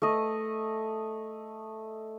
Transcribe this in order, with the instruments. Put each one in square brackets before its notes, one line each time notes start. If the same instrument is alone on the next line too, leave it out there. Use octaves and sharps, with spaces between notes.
[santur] A3 D#5